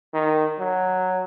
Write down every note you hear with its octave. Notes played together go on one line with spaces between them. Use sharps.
D#3
F#3